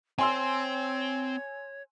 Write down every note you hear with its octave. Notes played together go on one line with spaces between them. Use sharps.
C4 C#5 G#5 C6 E6